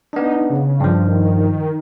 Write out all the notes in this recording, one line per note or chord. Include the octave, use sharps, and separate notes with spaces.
B3 D4 D#4
C#3
G2 F3
D#3